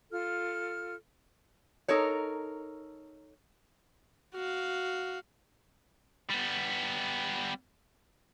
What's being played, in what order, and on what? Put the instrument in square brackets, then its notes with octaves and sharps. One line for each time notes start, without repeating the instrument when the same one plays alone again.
[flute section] F4 A4 F6
[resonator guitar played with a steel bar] D#4 A4 A#4 C#5
[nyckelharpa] F#4 F5
[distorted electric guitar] G3 B3